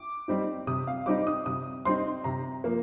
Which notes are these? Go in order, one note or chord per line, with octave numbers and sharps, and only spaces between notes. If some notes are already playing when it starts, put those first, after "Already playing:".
Already playing: D6
G3 C4 D#4
C3 D#6
F5
G3 C4 D#4 D6
D#6
C3 D#6
G3 C4 D#4 C6
C3 A#5
F3 A#3